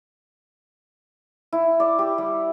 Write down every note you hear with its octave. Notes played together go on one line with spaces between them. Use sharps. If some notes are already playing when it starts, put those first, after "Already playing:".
E4
D5
G4
G3